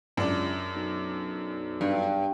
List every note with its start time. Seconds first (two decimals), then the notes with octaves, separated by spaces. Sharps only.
0.17 C#2 F#2 D4
0.75 B1
1.81 G2